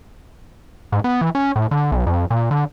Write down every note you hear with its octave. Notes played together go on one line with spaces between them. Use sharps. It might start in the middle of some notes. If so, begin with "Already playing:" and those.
G#2
B3
E3
C#4
A2
D3
B1
F2
A#2
D3